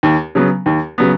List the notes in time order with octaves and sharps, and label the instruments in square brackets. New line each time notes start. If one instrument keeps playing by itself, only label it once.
[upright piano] D#2
C#3 F#3 B3
D#2
C#3 F#3 B3